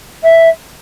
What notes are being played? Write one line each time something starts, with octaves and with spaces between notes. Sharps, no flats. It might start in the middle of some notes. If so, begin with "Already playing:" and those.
E5